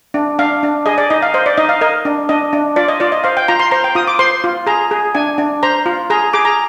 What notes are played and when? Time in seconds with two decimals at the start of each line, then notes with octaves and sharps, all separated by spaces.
0.14 D4
0.39 D4 F5
0.63 D4
0.86 G#4 D#5
0.98 D5
1.10 D#4 D#5
1.22 F5
1.34 C5 D#5
1.46 D5
1.57 D#4 D#5
1.69 F5
1.81 A#4 D#5
2.05 D4
2.29 D4 D#5
2.53 D4
2.76 F4 D5
2.88 D#5
3.00 F4 D5
3.12 D#5
3.24 C5 F5
3.37 G5
3.48 F4 A#5
3.60 C6
3.71 C5 A#5
3.84 G5
3.95 F4 D#6
4.07 D6
4.19 C5 C6
4.44 F4
4.67 G#4 A#5
4.91 G#4
5.15 D4 G#5
5.38 D4
5.63 C5 A#5
5.86 F4
6.10 G#4 A#5
6.33 G#4 D6
6.45 A#5